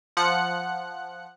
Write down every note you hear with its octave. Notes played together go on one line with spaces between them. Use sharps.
F3 F#5 F#6 C#7